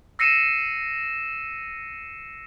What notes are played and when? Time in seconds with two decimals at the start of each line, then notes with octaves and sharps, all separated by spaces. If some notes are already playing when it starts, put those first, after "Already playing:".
0.19 E6 A#6 C7 C#7 D#7 E7